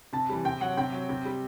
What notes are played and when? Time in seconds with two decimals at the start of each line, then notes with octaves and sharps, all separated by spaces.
0.13 C3 A5
0.29 E3 G3
0.45 C3 G5
0.61 F#3 F#5
0.77 C3 G5
0.92 F#3
1.09 C3
1.25 G3